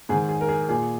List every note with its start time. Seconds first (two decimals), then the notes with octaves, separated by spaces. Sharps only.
0.09 G#2 D#3 G#4
0.29 G#4
0.41 A#4
0.49 G#4
0.69 A#2 G#4